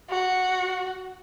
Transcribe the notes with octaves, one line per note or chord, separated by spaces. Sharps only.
F#4